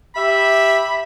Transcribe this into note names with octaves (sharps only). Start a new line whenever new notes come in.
G4 E5 B5